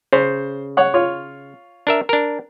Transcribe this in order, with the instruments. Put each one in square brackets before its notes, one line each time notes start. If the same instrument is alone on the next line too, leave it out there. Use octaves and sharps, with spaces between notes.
[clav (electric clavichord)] C#3 [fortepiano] C5
[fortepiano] C#5 F#5
F4 C#5
[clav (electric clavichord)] D4 A#4 E5
D4 A#4